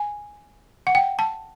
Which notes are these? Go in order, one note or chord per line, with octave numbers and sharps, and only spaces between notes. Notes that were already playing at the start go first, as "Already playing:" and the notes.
Already playing: G#5
F#5
G5
A5